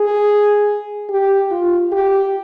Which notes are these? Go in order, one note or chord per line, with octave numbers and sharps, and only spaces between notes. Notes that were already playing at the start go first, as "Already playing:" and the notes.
Already playing: G#4
G4
F4
G4